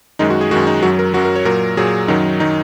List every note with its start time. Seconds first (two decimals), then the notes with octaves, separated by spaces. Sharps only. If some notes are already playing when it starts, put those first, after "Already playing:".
0.19 F#2 D#3 G#3 D#4
0.30 F#4
0.41 G#4
0.51 F#2 D#3 G#3 F#4
0.67 D#4
0.83 F#2 F#3 F#4
0.99 A#4
1.14 F#2 F#3 F#4
1.25 A#4
1.36 C#5
1.45 A#2 F#3 A#4
1.77 A#2 F#3 G#4
2.08 F#2 D#3 F#3 D#4
2.40 D#3 F#3 D#4